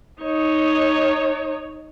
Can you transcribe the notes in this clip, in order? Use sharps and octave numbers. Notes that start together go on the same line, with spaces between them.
D#4 C#5